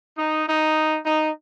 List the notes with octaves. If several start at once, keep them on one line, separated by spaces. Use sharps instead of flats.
D#4
D#4
D#4